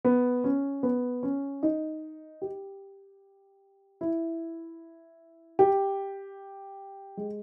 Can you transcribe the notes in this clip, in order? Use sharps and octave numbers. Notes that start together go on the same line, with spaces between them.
B3
C#4
B3
C#4
D#4
G4
E4
G4
G#3